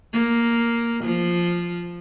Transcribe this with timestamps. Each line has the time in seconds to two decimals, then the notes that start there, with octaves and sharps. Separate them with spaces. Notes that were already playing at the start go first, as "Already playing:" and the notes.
0.13 A#3
1.04 F3